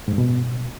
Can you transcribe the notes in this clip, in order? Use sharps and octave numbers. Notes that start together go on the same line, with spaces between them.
G#2
G2
B2